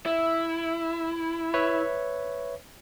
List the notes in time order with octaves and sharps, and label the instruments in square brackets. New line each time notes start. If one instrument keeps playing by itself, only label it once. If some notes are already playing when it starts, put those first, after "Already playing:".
[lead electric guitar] E4
[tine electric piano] B4 C#5 E5